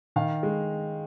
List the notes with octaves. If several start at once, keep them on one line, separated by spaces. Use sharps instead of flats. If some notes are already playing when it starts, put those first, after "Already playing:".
D#3 F5
G#3